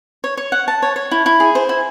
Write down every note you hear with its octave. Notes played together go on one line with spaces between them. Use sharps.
C#5
C#5
F#5
A5
C#5
C#5
E4
E4
G#4
C5
E4